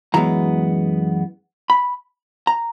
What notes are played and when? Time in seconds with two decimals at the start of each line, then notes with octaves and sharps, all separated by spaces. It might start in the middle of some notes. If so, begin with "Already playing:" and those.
0.14 F#2 E3 G#3 B3 A#5
1.70 B5
2.47 A#5